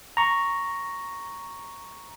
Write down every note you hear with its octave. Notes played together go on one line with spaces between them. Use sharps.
A#5 C#6